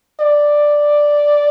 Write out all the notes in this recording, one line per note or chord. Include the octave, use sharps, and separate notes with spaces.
D5